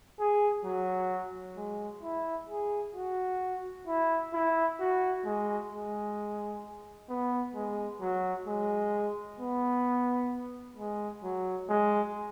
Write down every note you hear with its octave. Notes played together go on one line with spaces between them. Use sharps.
G#4
F#3
G#3
E4
G#4
F#4
E4
E4
F#4
G#3
G#3
B3
G#3
F#3
G#3
B3
G#3
F#3
G#3